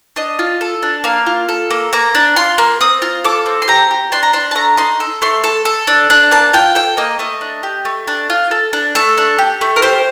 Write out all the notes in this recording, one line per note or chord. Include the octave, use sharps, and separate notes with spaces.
D4 D#5
F4
A4
D4
A#3 F5
F4
A4
A#3
A#3 A#5
D4
F4 C6
A#3
C4 D#6
F4
A4 D6
C4
C6
G4 A#5
G4
D4 C6
A#5
D4 C6
A5
A3 A#5
D#4 C6
A4
A3 C6
A4
A4
D4
D4
A#3 A5
F4 G5
A4 G5
A#3 D#5
A3 D#5
D4
G4
A3
D4
F4
A4
D4
A3 A4
D4
G4
A3
A#4
G4 C5